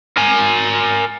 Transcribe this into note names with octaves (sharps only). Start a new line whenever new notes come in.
A#4 G#5